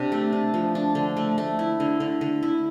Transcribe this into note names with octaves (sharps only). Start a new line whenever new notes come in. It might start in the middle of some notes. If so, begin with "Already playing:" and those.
Already playing: C3 D4
A3
D4
F3
D4
D3
A3
A3
E4
D3
D3
D3
E4